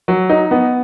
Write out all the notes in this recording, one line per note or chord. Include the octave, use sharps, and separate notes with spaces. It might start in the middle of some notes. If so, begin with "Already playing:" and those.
F#3
D#4
B3